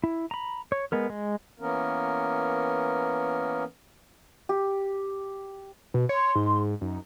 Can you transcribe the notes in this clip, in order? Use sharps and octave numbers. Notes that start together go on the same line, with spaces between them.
E4
A#5 B5
C#5
G#3 B3 A#4
G#3
E3 A#3 B3 C#4 A#4
G4
B2
C#5 C6
G#2
F#2 D#4